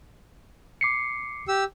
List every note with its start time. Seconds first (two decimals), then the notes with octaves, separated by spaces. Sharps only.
0.81 D6 C7 C#7
1.48 G4 E6